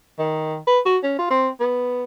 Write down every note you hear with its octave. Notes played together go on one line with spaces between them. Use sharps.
D#3
B4
F#4
C#4
F4
C4
B3